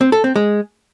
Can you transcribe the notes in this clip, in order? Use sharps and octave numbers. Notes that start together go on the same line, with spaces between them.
C4
A4
C4
G#3